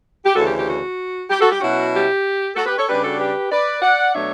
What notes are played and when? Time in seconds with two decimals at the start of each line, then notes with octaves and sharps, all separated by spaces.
0.25 G4
0.35 D2 C#3 E3 F#4 A4
0.46 G4
0.57 G4
0.68 F#4
1.30 G4
1.40 F#4 A4
1.51 G4
1.61 B2 F#3 C#4 E4 F#4
1.94 G4
2.56 F#4 A4
2.66 G4 B4
2.77 A4 C#5
2.88 C#3 G3 D4 G4 B4
3.03 F#4 A4
3.19 G4 B4
3.51 B4 D5
3.82 D5 F#5
4.14 B2 F#3 A3 D4 C#5 E5